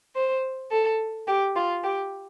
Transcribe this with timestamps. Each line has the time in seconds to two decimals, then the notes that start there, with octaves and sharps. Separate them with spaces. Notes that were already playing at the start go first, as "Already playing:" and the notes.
0.16 C5
0.71 A4
1.28 G4
1.56 F4
1.84 G4